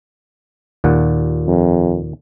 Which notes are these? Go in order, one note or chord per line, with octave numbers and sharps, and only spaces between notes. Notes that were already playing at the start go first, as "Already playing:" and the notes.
D#2 A#2 F#5
F2